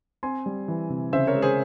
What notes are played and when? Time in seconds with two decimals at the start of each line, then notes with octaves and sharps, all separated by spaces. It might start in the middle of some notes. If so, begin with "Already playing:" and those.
0.23 C4 G#5 C6
0.46 G3
0.68 E3
0.90 C3
1.12 C#3 C5 E5
1.27 A#4 C#5
1.35 G#3
1.42 G#4 C5